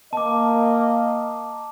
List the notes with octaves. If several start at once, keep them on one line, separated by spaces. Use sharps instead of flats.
A#3 D#5 A5 D6